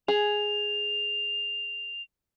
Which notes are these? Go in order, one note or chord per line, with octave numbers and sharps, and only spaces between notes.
G#4 F7